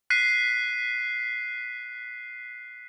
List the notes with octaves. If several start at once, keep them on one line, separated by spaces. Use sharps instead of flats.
F#6 B6 C7 D#7